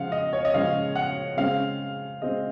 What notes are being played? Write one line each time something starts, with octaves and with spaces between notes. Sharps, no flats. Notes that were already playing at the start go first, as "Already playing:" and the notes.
Already playing: C#3 F3 G#3 F5 F#5
D#5
C#5
D#5
C#3 F3 G#3 F5
F#5
C#3 G#3 C4 F5
C#3 G#3 C4 D#5